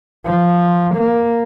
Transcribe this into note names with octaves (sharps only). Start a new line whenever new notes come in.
F3
A#3